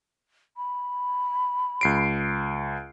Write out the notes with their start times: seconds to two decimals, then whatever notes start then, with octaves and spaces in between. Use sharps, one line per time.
0.57 B5
1.81 C#2 C7 D7